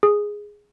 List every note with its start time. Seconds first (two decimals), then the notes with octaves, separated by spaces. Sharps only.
0.03 G#4